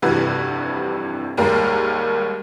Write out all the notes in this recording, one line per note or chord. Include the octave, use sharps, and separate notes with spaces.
F1 G2 C3 E3 F#4 B4
D#2 G#2 G3 A#4 F5